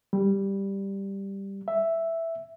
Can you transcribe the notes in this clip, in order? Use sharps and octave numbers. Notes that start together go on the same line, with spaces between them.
G3
E5